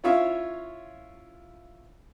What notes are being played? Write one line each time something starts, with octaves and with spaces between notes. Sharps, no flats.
C#4 E4 F4 C#5 E5 F5